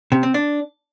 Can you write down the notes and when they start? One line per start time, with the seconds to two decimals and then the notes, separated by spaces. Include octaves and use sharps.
0.12 C3
0.23 C4
0.34 D4